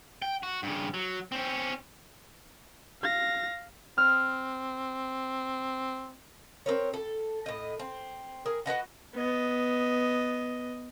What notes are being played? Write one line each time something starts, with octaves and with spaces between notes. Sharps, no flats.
G5
F#4
G2 C#3
F#3
C4 C#4
F5 A#6
C4 F6
C4 A#4 C#5
A4
A2 D#5
C4
G#4 A#4
F#4 B4 D#5 F#5
B3 D#5